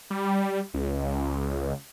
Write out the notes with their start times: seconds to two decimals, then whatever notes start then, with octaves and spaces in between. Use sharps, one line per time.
0.10 G3
0.74 C#2